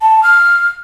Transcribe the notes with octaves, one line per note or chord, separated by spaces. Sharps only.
A5
F6